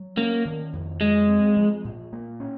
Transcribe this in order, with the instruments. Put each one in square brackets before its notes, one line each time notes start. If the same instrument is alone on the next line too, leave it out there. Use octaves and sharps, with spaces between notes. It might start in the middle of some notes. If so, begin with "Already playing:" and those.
Already playing: [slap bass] F#3
[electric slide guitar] A#3 [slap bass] C#4
[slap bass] D#3
F2
[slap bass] F#3 [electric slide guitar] G#3
[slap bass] C4
F3
A#2
A#3
C#4